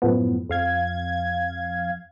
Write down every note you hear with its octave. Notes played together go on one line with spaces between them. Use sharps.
F#2 A2 F3 B3
F2 F5 G#6